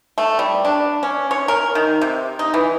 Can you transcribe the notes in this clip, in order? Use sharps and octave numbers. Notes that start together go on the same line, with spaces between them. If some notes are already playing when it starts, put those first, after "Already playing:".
A3
G3
D4
C#4
C#5
A#4
D#3
C3
D#4
E3